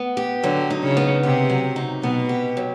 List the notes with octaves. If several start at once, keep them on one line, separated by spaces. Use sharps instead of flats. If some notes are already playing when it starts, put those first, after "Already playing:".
Already playing: B3
G4
D3 F#3
D#4
C#3
B3
C3 G4
F#3
D#4
B2 B3
G4
F#3